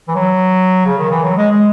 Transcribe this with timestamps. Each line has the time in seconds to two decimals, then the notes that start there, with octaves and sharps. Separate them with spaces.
0.08 E3
0.15 F#3
0.85 C#3
0.98 D#3
1.10 E3
1.23 F#3
1.37 G#3
1.51 G#3